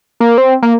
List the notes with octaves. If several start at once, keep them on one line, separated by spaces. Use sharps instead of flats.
A#3
C4
A#3